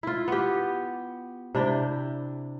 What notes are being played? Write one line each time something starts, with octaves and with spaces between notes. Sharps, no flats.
E4 F4
B3 G4
C3 D4 E4 G5